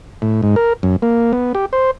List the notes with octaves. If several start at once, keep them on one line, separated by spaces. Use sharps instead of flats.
A2
G#2
A#4
F#2
A#3
B3
G4
C5